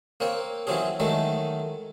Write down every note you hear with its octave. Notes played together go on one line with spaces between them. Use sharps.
A#3 C4 C#5
E3 F#3 C4 C#4 G#4
D#3 F#3 G#3 A3